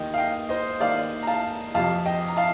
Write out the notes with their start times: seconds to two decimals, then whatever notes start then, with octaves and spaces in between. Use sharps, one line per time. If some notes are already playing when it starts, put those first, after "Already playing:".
Already playing: D#2 D#3 D#5 G5
0.14 F5
0.18 D#5 G5
0.49 C5 D#5
0.80 D#2 D#3 D5 F5
1.23 A#5
1.27 F5 A5
1.74 F2 C3 F3 F5 A5
2.06 D#5 G5
2.28 A#5
2.37 F5 A5